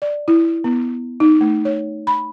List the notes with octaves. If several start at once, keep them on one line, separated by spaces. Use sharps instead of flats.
D5
E4
B3
D#4
A3
C#5
B5